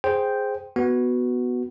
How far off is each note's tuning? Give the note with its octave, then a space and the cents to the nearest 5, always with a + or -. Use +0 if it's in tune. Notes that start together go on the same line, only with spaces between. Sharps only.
G#4 +0 C5 +0 G5 +0
B3 +0 F#4 +0